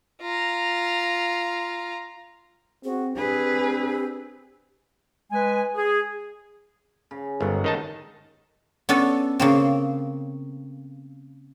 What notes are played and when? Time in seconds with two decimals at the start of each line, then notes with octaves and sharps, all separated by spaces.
0.22 F4 A#5
2.84 C4 F#4 G#4
3.17 C4 D4 G4 G#4 B4
5.32 G#3 B4 G#5
5.75 G#4
7.11 C#3
7.41 G1 G#2 F#3 F#5
7.64 D#3 D#4 A5
8.89 B3 C#4 D4 A4
9.39 C#3 A#3 C4